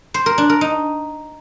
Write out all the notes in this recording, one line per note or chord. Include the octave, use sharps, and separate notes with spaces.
C5
A#4
D4
A#4
D#4